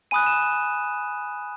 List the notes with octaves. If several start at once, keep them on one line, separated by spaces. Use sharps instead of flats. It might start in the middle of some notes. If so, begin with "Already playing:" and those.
G#5 B5 D#6 F#6 D#7
E7